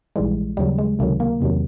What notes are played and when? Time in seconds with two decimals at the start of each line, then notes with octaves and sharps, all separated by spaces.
0.16 A#1 G#2 E3 G3 G#3
0.57 D#2 C#3 F#3 G3
0.78 G#3
0.99 C#2 C3 D#3 F#3 A3
1.20 A#3
1.41 E2 C3 D#3 F#3